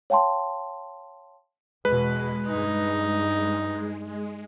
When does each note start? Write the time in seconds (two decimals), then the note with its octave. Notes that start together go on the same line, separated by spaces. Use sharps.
0.10 C#5 F5 G5 A5 C6
1.85 E2 B2 G#3 B4
2.47 G2 D#4